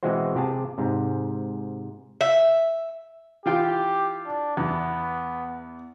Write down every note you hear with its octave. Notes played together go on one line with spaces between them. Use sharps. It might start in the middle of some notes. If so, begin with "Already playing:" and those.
B2 E3 G#3 C4 F#4 C5
C3 G4 G#4 A5
G#2 C3
E5
E3 F4 G4 G5
D4
E2 B3